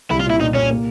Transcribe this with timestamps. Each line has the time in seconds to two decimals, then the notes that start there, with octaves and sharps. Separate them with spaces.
0.11 C2 E4
0.20 F4
0.26 A#2 E4
0.41 A#2 D#4
0.55 A#2 C#4
0.70 A#3